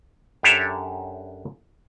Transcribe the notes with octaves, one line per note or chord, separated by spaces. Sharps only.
F#2 D4 G4 A4 C#5 E5